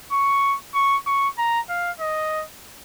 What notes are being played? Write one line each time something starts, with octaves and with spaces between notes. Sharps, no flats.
C#6
C#6
C#6
A#5
F5
D#5